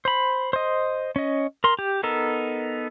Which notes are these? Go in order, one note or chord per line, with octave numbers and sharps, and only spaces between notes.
C5 B5
C5 D#5
C#4 D#5
A#4 C6
G4
B3 D#4 A4 A#4